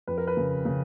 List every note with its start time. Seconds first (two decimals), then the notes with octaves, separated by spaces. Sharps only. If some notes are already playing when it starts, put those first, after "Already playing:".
0.07 F2 B4
0.18 A#4
0.27 B4
0.37 C#3
0.65 C#3